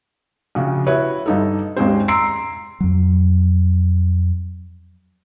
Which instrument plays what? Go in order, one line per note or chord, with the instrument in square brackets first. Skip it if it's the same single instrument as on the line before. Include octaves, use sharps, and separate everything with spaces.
[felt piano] A#1 C#3 F#4
E4 F#4 B4 C#5
G1 D#4 A4
G#1 D#2 G#3 C4 C#4 C5
A#5 C6 E6 C7 D7
[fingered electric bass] F2 F#3